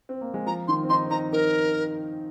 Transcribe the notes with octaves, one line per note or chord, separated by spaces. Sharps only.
C4
A#3
G#3
F3 A#5
D#3 C6
C4
D#4 C6
C4
D#4 A#5
D#4 A#4